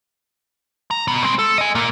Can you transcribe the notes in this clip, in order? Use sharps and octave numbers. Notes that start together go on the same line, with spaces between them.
A#5
B2 B3
G#3 C4
A4
D#5 G#5
A#2 A#3